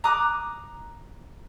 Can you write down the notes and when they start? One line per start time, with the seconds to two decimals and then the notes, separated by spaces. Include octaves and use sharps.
0.04 A#5 D6 D#6 F#6